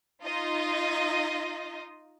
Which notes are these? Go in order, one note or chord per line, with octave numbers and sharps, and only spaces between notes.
D#4 F4 D#5